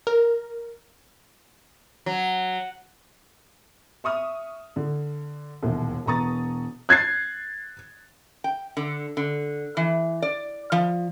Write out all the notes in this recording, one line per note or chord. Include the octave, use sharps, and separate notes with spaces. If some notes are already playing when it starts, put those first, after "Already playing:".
A#4
F#3
E5 C#6 D#6 F6
D3
E1 A#1 D#2
E1 B3 A#5 C#6 D#6 A6
F#6 G#6 A6 C7
G5
D3
D3
E3
D5
F3